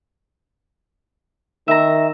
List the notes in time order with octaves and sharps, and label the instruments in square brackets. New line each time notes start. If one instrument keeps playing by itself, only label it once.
[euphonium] D#3 [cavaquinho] E5 A#5